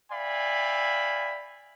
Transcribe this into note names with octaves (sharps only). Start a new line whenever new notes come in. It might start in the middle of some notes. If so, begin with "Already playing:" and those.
D5 E5 F5 G5 G#5 B5